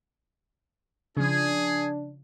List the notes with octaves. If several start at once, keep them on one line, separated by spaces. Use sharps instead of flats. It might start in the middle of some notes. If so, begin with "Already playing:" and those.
C#3 F3 D4 G#4